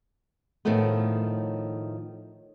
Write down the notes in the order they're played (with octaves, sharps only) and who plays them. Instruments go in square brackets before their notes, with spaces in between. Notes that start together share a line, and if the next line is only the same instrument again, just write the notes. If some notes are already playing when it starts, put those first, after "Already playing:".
[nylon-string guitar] A2 D#3 F3 A3 B3